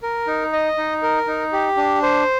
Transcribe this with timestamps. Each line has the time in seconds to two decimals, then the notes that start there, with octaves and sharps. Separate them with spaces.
0.03 A#4
0.27 D#4
0.53 D#5
0.78 D#4
1.03 A#4
1.27 D#4
1.53 G4
1.77 D4
2.03 C5